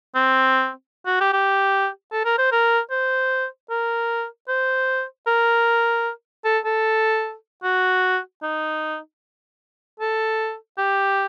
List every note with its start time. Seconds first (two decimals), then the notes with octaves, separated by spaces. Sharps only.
0.15 C4
1.07 F#4
1.21 G4
1.33 G4
2.12 A4
2.25 A#4
2.38 C5
2.52 A#4
2.90 C5
3.70 A#4
4.48 C5
5.27 A#4
6.45 A4
6.65 A4
7.63 F#4
8.42 D#4
10.00 A4
10.78 G4